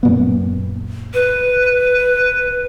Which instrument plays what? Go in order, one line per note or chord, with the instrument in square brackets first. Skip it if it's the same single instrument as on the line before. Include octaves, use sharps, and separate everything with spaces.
[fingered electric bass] F#2 A#2 B3
[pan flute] B4